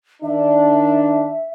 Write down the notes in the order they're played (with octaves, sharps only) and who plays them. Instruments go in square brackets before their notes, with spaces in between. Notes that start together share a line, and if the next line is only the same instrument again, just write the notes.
[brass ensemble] D#3 D4 [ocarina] E5